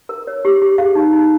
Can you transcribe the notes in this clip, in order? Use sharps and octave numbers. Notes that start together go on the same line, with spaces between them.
A#4
C#5
G4
G4
G#4 F5
D#4
D#4